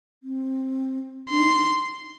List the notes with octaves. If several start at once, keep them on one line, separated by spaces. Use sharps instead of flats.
C4
D4 C6
D#4